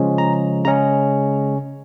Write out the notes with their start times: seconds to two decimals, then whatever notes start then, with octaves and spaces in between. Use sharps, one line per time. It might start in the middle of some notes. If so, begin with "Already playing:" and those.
Already playing: C#3 F3 G#3 C#4
0.18 A#5
0.65 C#3 G#3 C#4 A#5